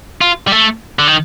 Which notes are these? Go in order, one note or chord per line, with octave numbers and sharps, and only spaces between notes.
F4
G3
A3
D3
D#3